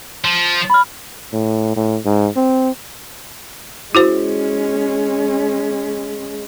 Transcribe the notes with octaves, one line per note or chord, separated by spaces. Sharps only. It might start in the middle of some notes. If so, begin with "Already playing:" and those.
F3
B5 F6
A2
A2
G#2
C4
G#3 C#4 E4 F#4 C5